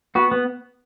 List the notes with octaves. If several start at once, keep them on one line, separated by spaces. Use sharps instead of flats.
B3 F#4
B3